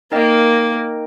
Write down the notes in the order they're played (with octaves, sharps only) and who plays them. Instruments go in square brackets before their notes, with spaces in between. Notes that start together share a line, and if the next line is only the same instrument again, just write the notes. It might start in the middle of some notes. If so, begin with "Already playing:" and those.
[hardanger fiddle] A#3 [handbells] D#4 A#4 D#5 G5